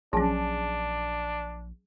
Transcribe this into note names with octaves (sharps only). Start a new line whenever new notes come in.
A#1 F#3 C#4 D4 G#4 G#5 A5